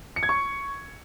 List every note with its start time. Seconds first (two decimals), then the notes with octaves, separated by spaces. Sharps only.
0.16 C#7
0.23 G#6
0.29 C#6